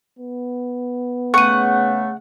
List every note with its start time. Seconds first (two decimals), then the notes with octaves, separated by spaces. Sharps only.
0.19 B3
1.34 C#3 A3 F#5 C#6 D#7